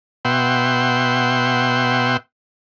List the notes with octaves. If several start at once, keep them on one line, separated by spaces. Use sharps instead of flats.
B2 E5 F#5 G5 C6